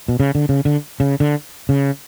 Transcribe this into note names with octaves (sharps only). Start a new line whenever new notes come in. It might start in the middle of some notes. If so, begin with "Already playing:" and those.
B2
C#3
D3
C#3
D3
C#3
D3
C#3